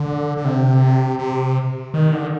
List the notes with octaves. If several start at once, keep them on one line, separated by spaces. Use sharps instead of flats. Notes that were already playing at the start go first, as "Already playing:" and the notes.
Already playing: D3
D3
C3
C3
D#3
D3